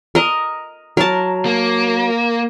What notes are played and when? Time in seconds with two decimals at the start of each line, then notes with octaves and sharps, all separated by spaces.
0.15 A#4 D#5
0.97 F#3 A#4 A5
1.45 A#3